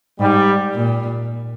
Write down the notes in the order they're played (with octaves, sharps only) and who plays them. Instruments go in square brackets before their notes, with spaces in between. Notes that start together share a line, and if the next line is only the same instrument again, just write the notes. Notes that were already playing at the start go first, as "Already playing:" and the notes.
[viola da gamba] G#2 [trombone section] G3
[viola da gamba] A#2